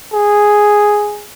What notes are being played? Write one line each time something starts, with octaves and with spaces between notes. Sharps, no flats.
G#4